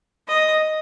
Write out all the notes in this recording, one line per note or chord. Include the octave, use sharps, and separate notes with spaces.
D#5